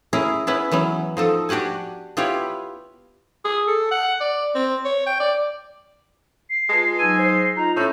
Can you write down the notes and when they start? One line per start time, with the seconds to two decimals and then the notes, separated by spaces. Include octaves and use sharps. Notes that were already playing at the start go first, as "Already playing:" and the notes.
0.13 C#4 E4 G#4 A#4
0.47 B3 C#4 E4 B4
0.72 E3 F#3 B3 C#4
1.17 F3 D#4 A4
1.49 D4 F#4 G4 F#5 G#5
2.17 B3 E4 F4 G4 B4 C#5
3.45 G#4
3.68 A4
3.91 F#5
4.20 D5
4.55 C4
4.84 C#5
5.07 G5
5.20 D5
6.50 C7
6.70 G#3 F4 B4 A5
6.99 F#3 D#4 G#5 E6 D#7
7.19 C5 C7
7.57 D#4 F4 D#5 A#5
7.77 A2 C#4 D4 E5 G6